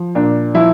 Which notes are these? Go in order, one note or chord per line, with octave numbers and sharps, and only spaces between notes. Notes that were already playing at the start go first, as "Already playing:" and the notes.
Already playing: F3
A#2 D4
F3 E4